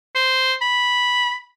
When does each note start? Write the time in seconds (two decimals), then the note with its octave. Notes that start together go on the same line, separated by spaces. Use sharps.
0.15 C5
0.62 B5